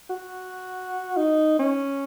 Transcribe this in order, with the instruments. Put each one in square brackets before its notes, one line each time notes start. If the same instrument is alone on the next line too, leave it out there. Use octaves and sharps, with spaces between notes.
[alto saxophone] F#4
D#4
C#4